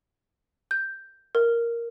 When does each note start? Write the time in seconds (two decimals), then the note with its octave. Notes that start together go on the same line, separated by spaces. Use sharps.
0.71 G6
1.35 A#4